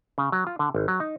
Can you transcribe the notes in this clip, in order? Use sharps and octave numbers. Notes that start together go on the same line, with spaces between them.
C#3
F#3
F4
D3
G#1
F#3
D#4